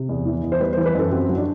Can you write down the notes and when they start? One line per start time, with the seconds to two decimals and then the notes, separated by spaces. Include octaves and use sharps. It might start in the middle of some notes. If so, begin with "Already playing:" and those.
Already playing: C3
0.09 E2
0.25 E3
0.43 E2
0.52 C5
0.60 G3 B4
0.73 C5
0.77 E3
0.86 B4
0.95 F#2 A4
1.12 F#3 C4
1.29 F#3
1.38 D4